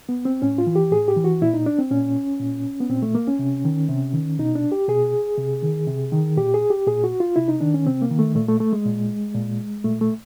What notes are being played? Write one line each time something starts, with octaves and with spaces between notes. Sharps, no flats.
B3
C4
A2 C#4
F4
E3
G4
A2 G#4
G4
E3
F#4
A#2 E4
D#4
D4
C4
A#2 C#4
A#2
B3
A#2 C4
A3
A#3
C#4
C3
D#3
C3
D#3
B2 D#4
D4
G4
B2 G#4
C3
D#3
C3
D#3
A#2 G4
G#4
G4
A#2 G#4
F#4
F4
C3 E4
D#4
D#3 D4
C#4
C3 C4
A#3
D#3
A3
A#2 A3
A3
A3
G#3
A#2
A#2
A#2 A3
A3